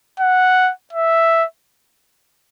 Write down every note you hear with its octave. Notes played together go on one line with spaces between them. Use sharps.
F#5
E5